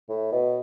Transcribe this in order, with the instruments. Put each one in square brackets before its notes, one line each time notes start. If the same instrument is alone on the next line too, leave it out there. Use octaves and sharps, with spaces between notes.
[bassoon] A2
B2